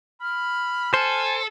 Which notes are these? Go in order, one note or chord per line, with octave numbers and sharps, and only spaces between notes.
B5 F6
A4 C5 G#5